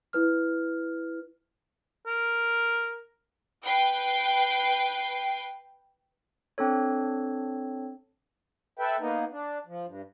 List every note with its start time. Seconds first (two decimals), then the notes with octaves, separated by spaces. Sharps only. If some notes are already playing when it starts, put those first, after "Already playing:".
0.13 E4 B4 F6
2.07 A#4
3.63 B4 G5 C7
6.58 C4 D4 A4 C#5
8.79 A4 B4 E5 G5
9.00 A#3 B3 D#4
9.31 D4
9.66 F3
9.86 G2